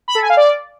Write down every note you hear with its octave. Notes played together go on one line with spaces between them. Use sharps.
B5
A4
G#5
F5
D5